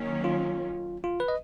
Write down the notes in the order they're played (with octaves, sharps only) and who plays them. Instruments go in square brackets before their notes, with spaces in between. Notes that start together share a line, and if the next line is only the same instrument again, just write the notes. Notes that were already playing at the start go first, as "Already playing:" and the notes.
Already playing: [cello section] D#3 F#3 A#3 C#4
[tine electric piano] F4
F4
B4
D#5